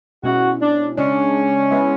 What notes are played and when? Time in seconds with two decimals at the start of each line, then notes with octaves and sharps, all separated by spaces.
0.23 B2 G#3 C#4 E4 F#4
0.60 D4
0.97 C#3 G#3 C#4 D4
1.71 G#3 B3 E4